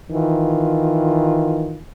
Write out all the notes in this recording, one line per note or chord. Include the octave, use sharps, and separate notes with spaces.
D#3 E3 F4